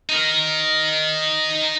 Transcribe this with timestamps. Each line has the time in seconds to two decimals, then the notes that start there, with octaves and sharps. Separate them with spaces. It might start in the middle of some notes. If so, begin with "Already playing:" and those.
0.09 D#4 A#4